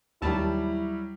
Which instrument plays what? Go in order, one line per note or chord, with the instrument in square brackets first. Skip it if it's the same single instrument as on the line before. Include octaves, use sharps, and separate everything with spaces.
[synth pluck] D#2 A5 [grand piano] F#3 G3 G4 [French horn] E4